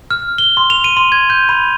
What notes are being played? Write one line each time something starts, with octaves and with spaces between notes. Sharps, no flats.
F6
G7
C6
F7
D#7
C6
G#6
G6
B5